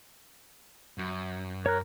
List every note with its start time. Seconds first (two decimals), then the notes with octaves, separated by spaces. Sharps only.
0.98 F#2
1.66 A#4 C#5 F#6